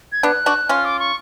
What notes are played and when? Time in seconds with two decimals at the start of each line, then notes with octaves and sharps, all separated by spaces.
0.12 G#6
0.23 B3 D4 F#6
0.46 D4 F#4
0.69 C#4 F4 F6
0.85 D6
1.00 C#6